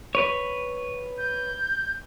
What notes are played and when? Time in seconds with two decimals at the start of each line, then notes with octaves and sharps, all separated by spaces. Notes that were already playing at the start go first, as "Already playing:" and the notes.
0.15 B4 C#5
1.18 G6